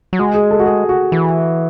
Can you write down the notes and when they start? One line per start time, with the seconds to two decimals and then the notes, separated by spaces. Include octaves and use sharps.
0.13 F#3
0.19 G#3 F#4
0.34 G#4
0.51 A4
0.60 F#4
0.66 G#4
0.89 F#4
1.12 E3